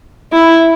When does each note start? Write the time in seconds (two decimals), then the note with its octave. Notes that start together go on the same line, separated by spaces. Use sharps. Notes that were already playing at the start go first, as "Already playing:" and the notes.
0.32 E4